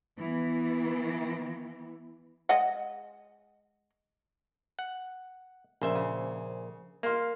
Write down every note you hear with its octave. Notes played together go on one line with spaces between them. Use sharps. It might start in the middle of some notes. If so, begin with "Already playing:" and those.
E3 B3
G#3 D#5 F#5
F#5
A#1 C#3 C5 E5
C#3
A#3 F5 C6